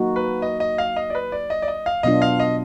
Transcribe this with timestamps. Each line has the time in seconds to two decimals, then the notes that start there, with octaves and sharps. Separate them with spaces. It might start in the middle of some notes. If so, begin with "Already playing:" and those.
Already playing: F#3 A#3 D#4 F#4
0.16 B4
0.42 D#5
0.60 D#5
0.78 F5
0.96 D#5
1.10 D5
1.15 B4
1.32 D5
1.50 D#5
1.62 D5
1.68 D#5
1.86 F5
2.03 B2 F#3 B3 D4 F4 D#5
2.22 F5
2.40 D#5